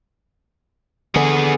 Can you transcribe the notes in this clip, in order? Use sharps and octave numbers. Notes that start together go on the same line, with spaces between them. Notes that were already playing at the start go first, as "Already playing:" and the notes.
D3 B3 G#4